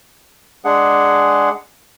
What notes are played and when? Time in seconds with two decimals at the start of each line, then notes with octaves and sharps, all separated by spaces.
0.65 G#3 D4 G#4 F#5